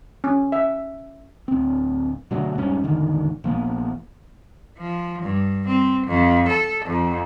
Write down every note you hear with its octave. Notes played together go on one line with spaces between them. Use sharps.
C#4
E5
D1 C4
B2 D3 F#3 A3
E1 G#2 G3 C#4
E1 A1 D3 D#3
A#1 F3 A#3 B3
F3
G2
C4
F2
A4
F2